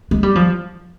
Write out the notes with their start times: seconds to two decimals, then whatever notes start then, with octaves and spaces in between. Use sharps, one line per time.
0.11 G#3
0.23 G3
0.35 F3